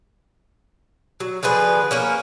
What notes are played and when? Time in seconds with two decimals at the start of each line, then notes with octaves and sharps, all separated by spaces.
1.20 F#3
1.43 D3 F3 G#4 B4
1.91 A#3 C#4 A#4